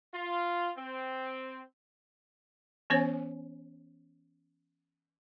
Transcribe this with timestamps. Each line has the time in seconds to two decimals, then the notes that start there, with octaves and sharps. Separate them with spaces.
0.13 F4
0.76 C4
2.90 E3 B3 C#4 C5 C#5 G#5